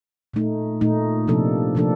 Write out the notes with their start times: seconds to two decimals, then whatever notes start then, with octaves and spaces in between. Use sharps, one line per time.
0.34 A#2 A3 D#4
0.81 A#2 A3 D#4
1.28 C3 F3 A#3 D4 A4
1.75 C3 F3 A#3 D4 A4